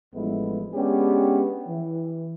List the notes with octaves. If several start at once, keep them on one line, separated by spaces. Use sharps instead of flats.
A1 F3 G#3 A3 B3 E4
G#3 B3 C#4 D4 G4
E3